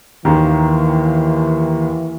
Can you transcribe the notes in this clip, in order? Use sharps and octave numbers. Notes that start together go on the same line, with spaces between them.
D#2 D#3 E3 A#3